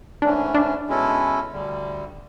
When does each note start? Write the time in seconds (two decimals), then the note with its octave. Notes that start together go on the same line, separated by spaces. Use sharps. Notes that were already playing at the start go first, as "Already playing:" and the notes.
0.22 G#2 E3 A3 C#4 D4
0.54 D4
0.87 B2 G#3 C#4 E4 A4
1.52 D2 D3 G3